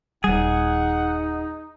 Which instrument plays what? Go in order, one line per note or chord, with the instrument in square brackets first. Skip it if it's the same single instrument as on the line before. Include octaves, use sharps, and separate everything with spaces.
[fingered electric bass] D#1 G3 [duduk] D#4 [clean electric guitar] G#4 [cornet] F#5